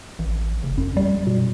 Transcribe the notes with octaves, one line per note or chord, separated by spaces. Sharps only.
A1
F#1
F#2
G3
B2